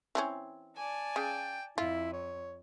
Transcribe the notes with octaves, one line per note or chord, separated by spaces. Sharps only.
E3 C4 C#4
D5 G#5 A5
C#3 G5
F2 E4 F4
C#5